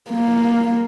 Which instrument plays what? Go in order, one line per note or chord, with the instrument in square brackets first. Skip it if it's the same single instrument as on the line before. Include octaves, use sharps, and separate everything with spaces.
[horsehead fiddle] A#3